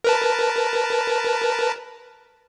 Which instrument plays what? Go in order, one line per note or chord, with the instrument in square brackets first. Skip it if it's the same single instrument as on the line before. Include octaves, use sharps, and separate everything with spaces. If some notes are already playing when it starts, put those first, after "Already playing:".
[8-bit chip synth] A#4 B4 A5